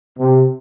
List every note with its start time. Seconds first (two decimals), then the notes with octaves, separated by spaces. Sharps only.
0.19 C3